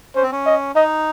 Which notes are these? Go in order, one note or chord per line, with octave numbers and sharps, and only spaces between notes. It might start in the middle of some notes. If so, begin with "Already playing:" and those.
C#4 C5
C4
C#4
D#5
D#4 D#5